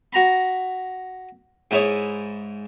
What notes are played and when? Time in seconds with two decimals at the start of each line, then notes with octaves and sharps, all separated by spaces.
0.13 F#4 A#5 B5
1.71 G#2 E4 C#5 D#6